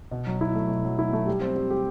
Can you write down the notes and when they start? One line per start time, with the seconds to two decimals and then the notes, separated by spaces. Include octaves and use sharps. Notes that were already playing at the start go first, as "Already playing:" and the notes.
0.11 B2
0.27 F#3
0.41 E4
0.55 A3
0.70 B2
0.85 F#3
0.99 E4
1.13 A3
1.27 G3
1.41 C4
1.56 G3
1.70 G4